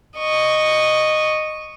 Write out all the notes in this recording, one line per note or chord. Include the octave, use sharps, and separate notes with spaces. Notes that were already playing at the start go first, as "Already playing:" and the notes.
D#5 C#6